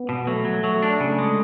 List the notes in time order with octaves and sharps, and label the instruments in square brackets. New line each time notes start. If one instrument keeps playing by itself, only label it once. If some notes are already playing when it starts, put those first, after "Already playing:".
Already playing: [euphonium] B3
[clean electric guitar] B2
[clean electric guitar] F#3 [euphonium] A3
[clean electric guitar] F#3
[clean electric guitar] F#3 [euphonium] A3
[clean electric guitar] D4
[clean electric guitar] C#3 [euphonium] A3
[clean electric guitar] G#3